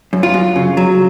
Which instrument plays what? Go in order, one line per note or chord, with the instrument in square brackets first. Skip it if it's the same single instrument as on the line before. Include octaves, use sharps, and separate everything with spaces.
[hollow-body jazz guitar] F#2
F4
F#2
C#3
F#3